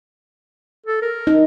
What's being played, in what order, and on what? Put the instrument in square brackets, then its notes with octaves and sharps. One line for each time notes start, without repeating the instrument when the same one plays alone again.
[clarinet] A4
A#4
[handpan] D#4